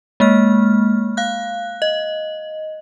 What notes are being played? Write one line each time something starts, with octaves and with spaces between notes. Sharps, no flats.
G#3 A#3 F6
F5 F#6
D#5